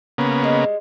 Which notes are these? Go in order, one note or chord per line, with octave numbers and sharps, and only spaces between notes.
C#3 A#3 B3
G3 G#3